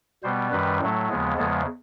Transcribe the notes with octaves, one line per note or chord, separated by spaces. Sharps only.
B2 G3 B3 C5
F#2 D#3 G3 B4
A2 F#3 A3
D#2 C#3 F3 G#3 B3
E2 C#3 F3 G#3 B3 A4